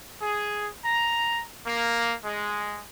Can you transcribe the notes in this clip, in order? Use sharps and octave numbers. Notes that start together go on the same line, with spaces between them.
G#4
A#5
A#3
G#3